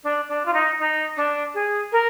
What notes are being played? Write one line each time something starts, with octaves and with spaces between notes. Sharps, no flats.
D4
D4
F4
D#4
D#4
D4
G#4
A#4